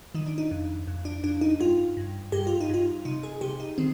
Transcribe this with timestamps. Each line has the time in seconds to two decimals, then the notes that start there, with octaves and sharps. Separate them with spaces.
0.15 D#3 D#4
0.26 D4
0.38 D#4
0.51 F2
0.87 F2
1.05 D4
1.24 F2 D4
1.41 D#4
1.60 G2 F4
1.97 G2
2.32 G2 G4
2.47 F4
2.61 D#4
2.69 G2 F4
3.05 C3 D#4
3.23 G#4
3.41 C3 G4
3.60 D#4
3.78 D#3 C4